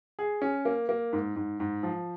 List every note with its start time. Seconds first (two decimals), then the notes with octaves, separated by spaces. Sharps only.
0.19 G#4
0.42 C#4
0.65 A#3
0.89 A#3
1.13 G#2
1.36 G#2
1.60 G#2
1.83 F3